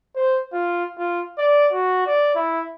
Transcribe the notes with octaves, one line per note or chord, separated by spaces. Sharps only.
C5
F4
F4
D5
F#4
D5
E4